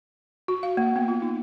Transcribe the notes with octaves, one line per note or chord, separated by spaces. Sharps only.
F#4
F5
A#3
B3
F4
D#4